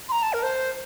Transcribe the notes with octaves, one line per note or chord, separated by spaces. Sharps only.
C6
A#5
A5
A#4
C5